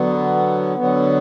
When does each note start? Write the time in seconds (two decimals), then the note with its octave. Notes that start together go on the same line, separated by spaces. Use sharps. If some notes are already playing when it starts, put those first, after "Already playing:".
Already playing: D3 F#3 B3
0.77 D3 F#3 B3